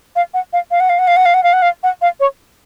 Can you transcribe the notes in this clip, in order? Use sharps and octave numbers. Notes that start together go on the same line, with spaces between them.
F5
F#5
F5
F5
F#5
F5
F#5
F5
F#5
F5
F#5
F5
F#5
F5
F#5
F5
C#5